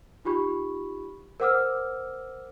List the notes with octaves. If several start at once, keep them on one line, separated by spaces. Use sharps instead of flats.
D#4 F4 G4 B5 C#6
A#4 C5 F#5 D6 E6 F6